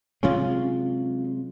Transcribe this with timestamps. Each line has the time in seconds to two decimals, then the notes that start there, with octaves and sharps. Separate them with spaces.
0.23 C3 F#3 G#3 C#4 F4